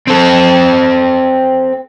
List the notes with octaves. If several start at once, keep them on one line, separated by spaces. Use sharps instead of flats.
C4 A4